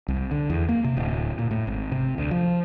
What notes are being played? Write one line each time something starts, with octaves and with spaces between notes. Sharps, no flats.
C2
D3
E2
A#3
C3
D1
A#2
A2
G#1
C3
D2
F3